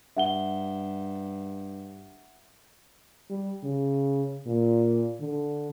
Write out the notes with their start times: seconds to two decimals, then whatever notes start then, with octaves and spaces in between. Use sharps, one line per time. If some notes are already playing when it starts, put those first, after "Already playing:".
0.17 G2 E5 F#5 G7
3.30 G3
3.64 C#3
4.46 A#2
5.20 D3